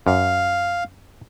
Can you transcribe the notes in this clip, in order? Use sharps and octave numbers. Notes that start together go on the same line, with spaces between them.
F#2 F5